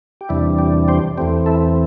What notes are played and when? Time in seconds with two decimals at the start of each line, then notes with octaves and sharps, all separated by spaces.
0.21 G4
0.29 E2 C3 E3 G3 D4 E4
0.58 G4
0.88 G4 C5
1.17 E2 E3 A3 C4 G4
1.46 E4 A4